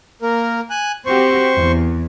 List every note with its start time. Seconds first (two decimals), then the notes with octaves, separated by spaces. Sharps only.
0.22 A#3 A#4
0.70 G#5 F#6
1.06 C4 F#4 G4 C5 C#6
1.57 E2